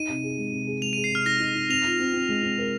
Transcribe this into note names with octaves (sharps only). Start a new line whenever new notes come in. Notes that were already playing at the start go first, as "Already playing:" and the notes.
Already playing: D#4 D#7
C3
G#4
G#3
C3
G#4
G#3 F7
D#7
G#4
C7
C3 F6
D#4 A#6
D#4
D#4
C4 F7
F4
C4
C4
G#3
C4
A#4